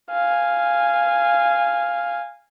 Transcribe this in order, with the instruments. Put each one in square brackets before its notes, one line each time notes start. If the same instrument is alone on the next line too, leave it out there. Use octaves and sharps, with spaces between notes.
[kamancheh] F5 G#5